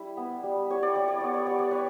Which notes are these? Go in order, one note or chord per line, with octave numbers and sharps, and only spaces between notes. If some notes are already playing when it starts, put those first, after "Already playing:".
Already playing: G3 E4
B3
G3
G3 C#5
D5
E4 C#5
D5
B3 C#5
D5
G3 C#5
D5
B4 C#5